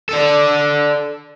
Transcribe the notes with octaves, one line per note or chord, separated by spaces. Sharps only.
A4 D5